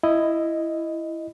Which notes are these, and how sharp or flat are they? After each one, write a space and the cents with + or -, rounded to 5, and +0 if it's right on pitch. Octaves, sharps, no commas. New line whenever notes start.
E4 +10 D#5 +0